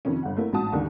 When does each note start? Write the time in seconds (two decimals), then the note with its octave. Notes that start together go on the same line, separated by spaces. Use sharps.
0.05 F2 C3 D#3 F3 C#4
0.23 G1 F#5
0.37 A3 A#3 E4
0.52 A1 G#2 F#4 A5 D#6
0.72 D#2 D3 D#3